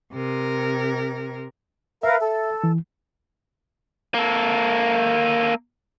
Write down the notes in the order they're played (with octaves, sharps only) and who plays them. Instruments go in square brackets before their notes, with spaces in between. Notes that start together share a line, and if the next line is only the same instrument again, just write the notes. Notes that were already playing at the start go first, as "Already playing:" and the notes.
[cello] C3 A#4
[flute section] A#4 B4 F5 [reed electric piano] E5
[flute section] A4
[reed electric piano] E3
[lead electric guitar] A#3 A4